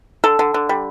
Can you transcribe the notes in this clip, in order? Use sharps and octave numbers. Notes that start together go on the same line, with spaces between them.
D3 A4
D3
D3
G3